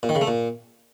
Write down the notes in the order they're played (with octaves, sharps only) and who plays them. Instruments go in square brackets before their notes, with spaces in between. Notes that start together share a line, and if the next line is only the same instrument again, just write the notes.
[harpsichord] A#2
D#3
C#3
A3
A#2